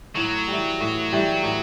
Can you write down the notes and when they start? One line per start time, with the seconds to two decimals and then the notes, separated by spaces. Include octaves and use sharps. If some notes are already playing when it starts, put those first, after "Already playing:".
0.16 A2 F#3
0.48 E3 G3
0.80 A2
1.13 E3 G3
1.43 A2